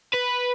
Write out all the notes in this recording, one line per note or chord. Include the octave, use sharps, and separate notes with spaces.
B4